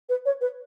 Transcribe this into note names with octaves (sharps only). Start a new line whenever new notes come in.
B4
C#5
B4